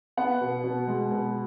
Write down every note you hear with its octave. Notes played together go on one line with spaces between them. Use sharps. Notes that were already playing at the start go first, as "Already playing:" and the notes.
B3 F#5
B2
B2
G#3
B2